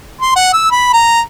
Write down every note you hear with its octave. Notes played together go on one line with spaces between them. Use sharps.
C6
F#5
E6
B5
A#5